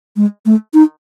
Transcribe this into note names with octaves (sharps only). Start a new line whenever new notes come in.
G#3
A3
D#4